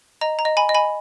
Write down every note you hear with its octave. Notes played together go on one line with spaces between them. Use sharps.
D#5 A#5
A#5
D#5
G#5 B5
D#5
G#5 B5